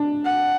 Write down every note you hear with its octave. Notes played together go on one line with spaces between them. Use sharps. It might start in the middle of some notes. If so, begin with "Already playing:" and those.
Already playing: D4
F#5